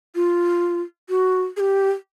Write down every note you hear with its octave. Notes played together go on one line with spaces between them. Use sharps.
F4
F#4
G#4
G4